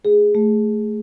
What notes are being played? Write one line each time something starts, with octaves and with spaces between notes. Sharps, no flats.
A3 G#4
A3